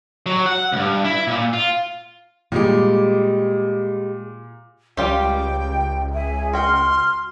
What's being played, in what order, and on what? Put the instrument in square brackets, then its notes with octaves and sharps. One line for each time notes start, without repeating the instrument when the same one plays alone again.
[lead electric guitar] F#3
F#5
C#2 G2
E4
A#2
F4
[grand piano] A#2 [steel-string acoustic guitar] G3 G#3 G4
[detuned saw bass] C#2 [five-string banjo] G3 F4 G4 [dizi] G5
[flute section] G#4 E5 G#5
[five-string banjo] F#4 G5 [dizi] C6 [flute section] F6